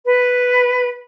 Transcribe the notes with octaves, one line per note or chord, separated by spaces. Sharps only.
B4